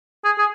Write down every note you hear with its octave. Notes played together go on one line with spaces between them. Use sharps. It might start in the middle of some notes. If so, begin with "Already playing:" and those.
G#4
G#4